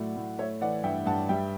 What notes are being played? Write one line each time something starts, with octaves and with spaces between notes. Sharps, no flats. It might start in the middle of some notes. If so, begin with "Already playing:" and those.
Already playing: A2 F#3 A3 D5 F#5
A2
A3 C#5 E5
E3 D5 F#5
G2 E5 G5
G2 F#5 A5
G3 E5 G5